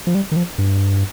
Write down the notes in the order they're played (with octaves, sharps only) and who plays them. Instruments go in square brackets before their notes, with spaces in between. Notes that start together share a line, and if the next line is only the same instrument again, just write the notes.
[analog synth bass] F3
G3
D#3
F3
G2